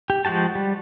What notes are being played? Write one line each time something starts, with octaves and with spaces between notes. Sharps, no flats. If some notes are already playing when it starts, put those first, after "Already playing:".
G4
F3 G#3 F#4 G4 A5
G3